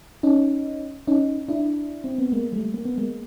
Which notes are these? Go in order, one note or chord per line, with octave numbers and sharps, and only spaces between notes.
C#4 D#4
C#4 D#4
D4 E4
C4
B3
G#3 A#3
G3 A3
A#3
B3
G#3 A#3